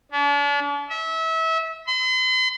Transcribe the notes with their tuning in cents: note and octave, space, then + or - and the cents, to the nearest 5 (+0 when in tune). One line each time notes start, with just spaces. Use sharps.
D4 -40
E5 -25
C6 -45